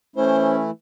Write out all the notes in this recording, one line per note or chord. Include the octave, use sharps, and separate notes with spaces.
E3 A3 C#4 E4 C5